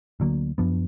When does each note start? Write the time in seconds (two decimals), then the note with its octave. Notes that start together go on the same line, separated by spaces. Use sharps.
0.20 D2 D3 F#3 A#3
0.58 F#2 F3 B3 D4